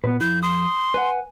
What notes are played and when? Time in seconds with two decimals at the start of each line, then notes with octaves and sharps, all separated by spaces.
0.04 A#2 B3 B4
0.21 F2 E4 G6
0.43 C6 D#6
0.94 B4 F#5 G#5